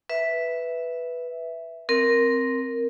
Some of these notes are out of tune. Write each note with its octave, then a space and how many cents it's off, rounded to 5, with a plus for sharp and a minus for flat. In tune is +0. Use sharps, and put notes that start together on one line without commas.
B4 +0 E5 +0
C4 +0 A#4 +0